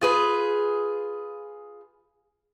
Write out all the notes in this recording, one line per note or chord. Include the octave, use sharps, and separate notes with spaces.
F4 G#4 B4